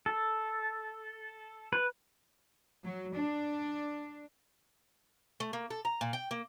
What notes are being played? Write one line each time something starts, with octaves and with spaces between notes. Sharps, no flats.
A4
B4
F#3
D4
A3
A#3
A4
A#5
A#2
G5
A#3